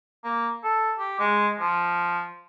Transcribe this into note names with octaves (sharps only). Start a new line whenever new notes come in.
A#3
A4
G4
G#3
F3